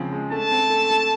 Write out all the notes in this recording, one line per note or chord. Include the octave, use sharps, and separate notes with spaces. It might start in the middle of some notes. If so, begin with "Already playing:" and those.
Already playing: C#3 F3 G#3 C4
G#3
A3 A5
C4
A3
A3